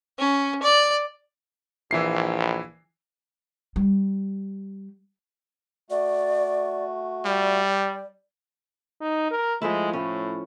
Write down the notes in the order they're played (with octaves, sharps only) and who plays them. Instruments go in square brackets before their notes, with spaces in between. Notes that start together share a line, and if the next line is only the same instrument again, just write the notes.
[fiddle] C#4
D5
[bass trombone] A#1 [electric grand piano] E3 E4 C7
[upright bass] G3
[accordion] A3 F#4 [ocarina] D5
[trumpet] G3 [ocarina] D5
[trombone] D#4
A#4
[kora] F3 A3 E4 [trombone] G#3
[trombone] A2 [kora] C#4